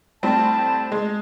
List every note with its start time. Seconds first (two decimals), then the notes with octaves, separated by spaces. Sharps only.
0.23 A2 G3 C4 A5
0.92 G#3